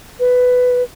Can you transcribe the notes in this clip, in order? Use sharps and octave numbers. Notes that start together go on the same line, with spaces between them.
B4